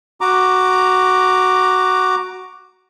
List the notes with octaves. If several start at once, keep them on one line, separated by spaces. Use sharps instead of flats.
F#4 A#5 D6